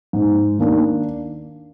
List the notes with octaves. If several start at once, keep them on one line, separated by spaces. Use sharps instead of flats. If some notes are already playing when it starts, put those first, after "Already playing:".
G#2
D#3 A#3 D4